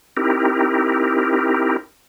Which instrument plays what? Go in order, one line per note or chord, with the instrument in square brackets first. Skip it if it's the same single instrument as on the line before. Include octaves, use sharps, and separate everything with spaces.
[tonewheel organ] C4 D#4 E4 G4 A#4